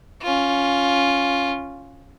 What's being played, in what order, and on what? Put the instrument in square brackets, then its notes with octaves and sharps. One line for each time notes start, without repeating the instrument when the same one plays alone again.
[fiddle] C#4 F4